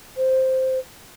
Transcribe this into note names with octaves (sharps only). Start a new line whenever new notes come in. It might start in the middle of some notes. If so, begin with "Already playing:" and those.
C5